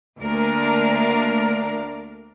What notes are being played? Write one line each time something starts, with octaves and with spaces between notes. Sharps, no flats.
D2 A#3 D4 A#4